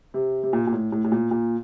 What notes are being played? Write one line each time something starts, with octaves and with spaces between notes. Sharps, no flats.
C3
C3
A#2
A#2
A2
A2
A2
A#2
A#2